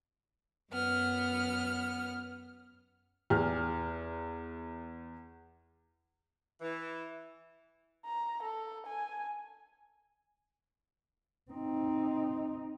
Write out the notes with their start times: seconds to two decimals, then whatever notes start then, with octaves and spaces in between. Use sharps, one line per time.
0.71 F#2 B3 F6
3.30 E2 F6
6.61 E3
8.05 A#5
8.43 A4
8.86 G#5
11.51 C4 D#4